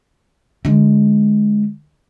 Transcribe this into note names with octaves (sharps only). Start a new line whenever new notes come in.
D3 G#3